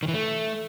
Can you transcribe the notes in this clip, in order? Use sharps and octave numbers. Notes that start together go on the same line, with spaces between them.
D#3
E3
A3